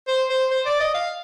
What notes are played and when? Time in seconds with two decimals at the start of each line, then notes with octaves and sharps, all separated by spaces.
0.08 C5
0.30 C5
0.51 C5
0.66 D5
0.80 D#5
0.94 F5